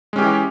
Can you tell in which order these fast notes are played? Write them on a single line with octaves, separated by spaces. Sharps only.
G#3 C#4 G4 E3